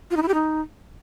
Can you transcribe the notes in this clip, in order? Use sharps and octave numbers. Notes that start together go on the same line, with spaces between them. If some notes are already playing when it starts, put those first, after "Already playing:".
F4
D#4
E4
G4
D#4